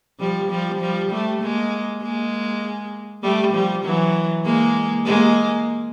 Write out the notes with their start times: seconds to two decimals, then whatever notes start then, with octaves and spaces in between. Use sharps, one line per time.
0.19 F3 G3
0.50 F3 G3
0.80 F3 G3
1.11 G3 A3
1.41 G#3 A#3
2.01 G#3 A#3
3.23 G3 A3
3.53 F3 G3
3.84 E3 F#3
4.44 G#3 A#3
5.05 G#3 A#3